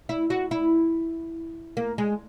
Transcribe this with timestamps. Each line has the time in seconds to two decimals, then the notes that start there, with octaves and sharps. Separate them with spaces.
0.09 E4
0.30 F#4
0.51 E4
1.77 A#3
1.98 G#3